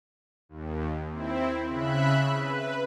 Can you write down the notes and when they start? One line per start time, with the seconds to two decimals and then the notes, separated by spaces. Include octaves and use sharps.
0.49 D#2
1.11 C4 E4
1.67 C#3 E5 B5 F#6
2.34 B4